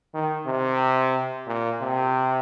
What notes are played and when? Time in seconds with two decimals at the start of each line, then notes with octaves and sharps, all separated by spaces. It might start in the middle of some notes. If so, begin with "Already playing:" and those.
0.14 D#3
0.46 C3
1.47 A#2
1.81 C3